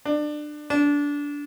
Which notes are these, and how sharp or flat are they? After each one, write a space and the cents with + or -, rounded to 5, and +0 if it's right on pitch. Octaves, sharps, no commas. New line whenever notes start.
D4 +25
D4 -20